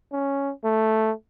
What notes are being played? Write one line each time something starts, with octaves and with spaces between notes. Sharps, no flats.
C#4
A3